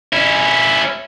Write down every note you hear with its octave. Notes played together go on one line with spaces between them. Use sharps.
C#4 E4